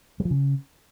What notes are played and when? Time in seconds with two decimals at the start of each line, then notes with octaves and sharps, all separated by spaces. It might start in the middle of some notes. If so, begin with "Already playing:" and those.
0.20 G3
0.25 F3
0.31 C#3